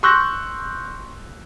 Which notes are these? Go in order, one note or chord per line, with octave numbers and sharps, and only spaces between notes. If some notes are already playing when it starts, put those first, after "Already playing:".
C6 C#6 E6 F#6 G6 A#6